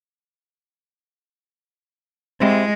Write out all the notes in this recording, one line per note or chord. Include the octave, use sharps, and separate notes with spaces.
G#3 C4 E4 G4